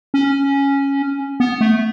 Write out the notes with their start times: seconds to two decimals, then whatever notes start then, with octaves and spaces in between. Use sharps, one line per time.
0.14 C#4
1.40 B3
1.61 A3